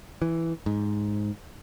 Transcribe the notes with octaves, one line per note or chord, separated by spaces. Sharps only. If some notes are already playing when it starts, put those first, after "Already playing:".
E3
G#2